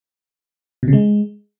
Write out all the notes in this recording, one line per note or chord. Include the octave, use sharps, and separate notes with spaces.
B2
C#3
G#3